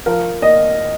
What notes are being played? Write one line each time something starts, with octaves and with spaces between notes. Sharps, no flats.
F3 A#4
A#3 D#5